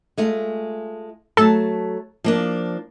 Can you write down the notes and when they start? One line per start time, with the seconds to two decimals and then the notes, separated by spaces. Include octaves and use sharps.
0.18 G#3 A3 F4
1.37 F#3 A3 A4 A5
2.24 F3 A#3 D4